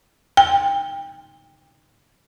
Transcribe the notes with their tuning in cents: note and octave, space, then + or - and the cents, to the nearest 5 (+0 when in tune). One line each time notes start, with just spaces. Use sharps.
G5 +25